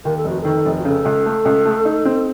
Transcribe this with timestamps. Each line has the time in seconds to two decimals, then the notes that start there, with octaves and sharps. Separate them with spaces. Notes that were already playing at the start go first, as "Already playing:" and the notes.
0.05 D#2 A#4
0.18 A4
0.25 F1 F#4
0.41 D#3 A4
0.65 F1
0.79 F#4
0.85 C#3 A4
1.05 C#2
1.26 A3
1.45 C#2
1.66 A3
1.85 D#4
2.05 C4